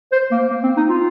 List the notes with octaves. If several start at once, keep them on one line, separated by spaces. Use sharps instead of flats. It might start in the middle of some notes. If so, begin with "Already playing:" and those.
C5
A#3
A#3
C4
D#4
F4